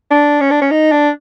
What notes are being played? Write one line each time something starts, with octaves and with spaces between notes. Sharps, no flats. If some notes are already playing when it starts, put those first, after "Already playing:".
D4
C#4
D4
C#4
D#4
D4